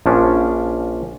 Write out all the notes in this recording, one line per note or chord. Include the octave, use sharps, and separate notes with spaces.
A#1 F3 C#4 D4